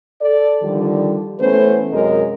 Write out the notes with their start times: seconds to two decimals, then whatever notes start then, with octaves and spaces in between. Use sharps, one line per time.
0.21 A4 D5
0.63 D3 D#3 F3 G3
1.39 E3 A3 B3 C#4 B4 C5
1.92 F#2 C3 G#3 A#4 D#5